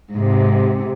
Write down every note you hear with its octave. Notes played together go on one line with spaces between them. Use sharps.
G#2 C3